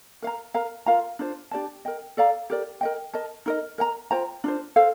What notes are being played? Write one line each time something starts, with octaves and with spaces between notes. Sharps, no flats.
A#4 F5 A#5
A#4 F5 A#5
F4 A#4 F5 A#5
D4 F4 C5
D4 G4 D5 A5
A#4 D#5 G5
A4 D5 F5 A#5
G4 A#4 D5
A#4 D#5 G5
A#4 D#5 A5
D#4 A#4 D#5
A#4 D#5 G5 A#5
F4 C5 G5 A#5
D4 F4 C5
A4 C5 F5